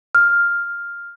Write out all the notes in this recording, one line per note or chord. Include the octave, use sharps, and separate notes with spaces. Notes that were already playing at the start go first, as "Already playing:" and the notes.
F6